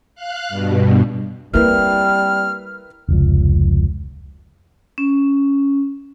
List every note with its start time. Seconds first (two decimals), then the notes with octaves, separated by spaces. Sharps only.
0.15 F5 F#6
0.49 G2 B2
1.54 G3 A#3 C4 E4 A#4 B4 F6
3.09 F1 C#2 F3
4.98 C#4